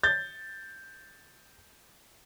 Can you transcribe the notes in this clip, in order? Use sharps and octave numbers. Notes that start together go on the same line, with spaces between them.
G6 A6